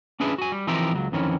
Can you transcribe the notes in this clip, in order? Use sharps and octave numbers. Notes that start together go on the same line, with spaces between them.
C#4 D4 E4 G#4 B4
F#4 G#5
G3
E3 F3 C4 D#4 G4 A#4
C#2 F#3
F2 D#3 E3 C#4